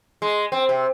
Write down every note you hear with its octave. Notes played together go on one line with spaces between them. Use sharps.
G#3
C4
C3